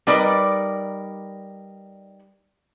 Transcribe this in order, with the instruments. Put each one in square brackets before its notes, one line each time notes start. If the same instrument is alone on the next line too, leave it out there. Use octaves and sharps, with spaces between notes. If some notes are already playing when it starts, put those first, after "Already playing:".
[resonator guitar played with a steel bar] G3 D#4 A#4 B4 D5